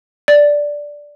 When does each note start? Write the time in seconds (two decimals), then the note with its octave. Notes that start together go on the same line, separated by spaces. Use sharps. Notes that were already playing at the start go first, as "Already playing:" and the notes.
0.28 D5